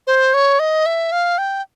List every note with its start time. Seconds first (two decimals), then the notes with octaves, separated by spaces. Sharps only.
0.07 C5
0.34 C#5
0.59 D#5
0.86 E5
1.12 F5
1.38 G5